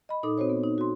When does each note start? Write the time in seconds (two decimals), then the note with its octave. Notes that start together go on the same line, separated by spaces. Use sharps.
0.09 D#5 B5
0.23 A#2 D#4 A4 D6 D#6
0.38 C4 F#4 C5 C#5
0.50 B3
0.63 D#4
0.78 F#4 C6